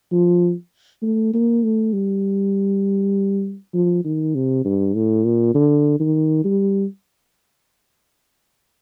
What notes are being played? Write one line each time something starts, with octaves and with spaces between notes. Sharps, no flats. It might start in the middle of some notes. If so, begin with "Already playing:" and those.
F3
A3
A#3
A3
G3
F3
D#3
C3
G2
A2
A#2
D3
D#3
G3